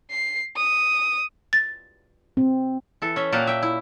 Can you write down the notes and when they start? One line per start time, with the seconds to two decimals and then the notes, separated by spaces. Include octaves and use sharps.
0.10 C7
0.57 D#6
1.53 A6
2.37 C4
3.02 E3 A4
3.16 C#4 E5
3.32 A#2 A#3 G4 F5 F#5 A5
3.47 E5 G5
3.63 E4